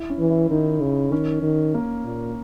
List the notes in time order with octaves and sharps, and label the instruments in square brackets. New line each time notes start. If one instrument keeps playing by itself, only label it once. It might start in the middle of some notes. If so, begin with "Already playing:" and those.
Already playing: [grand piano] E4
C#4
[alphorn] E3
[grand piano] E4
[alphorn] D#3 [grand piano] D#4
[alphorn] C#3
[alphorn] D#3 [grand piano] C#4
[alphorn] D#3
[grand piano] A#3
[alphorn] A#2